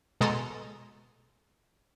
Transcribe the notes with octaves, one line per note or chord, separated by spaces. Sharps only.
B2 G#3 A4 A#5 C6 D#6